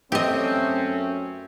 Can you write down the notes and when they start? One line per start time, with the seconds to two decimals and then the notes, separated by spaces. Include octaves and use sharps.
0.12 F#2 A3 C4 C#4 G4 D#5